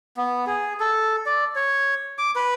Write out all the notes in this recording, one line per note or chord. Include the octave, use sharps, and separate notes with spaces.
B3
G#4
A4
D5
C#5
D6
B4